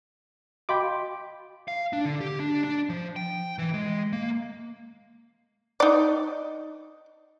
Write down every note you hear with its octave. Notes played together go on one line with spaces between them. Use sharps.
F#4 D#5 F5 G5 B5 D6
F5
D4
D3
G4
D4
D4
F3
G5
E3
G#3
A#3
D#4 D5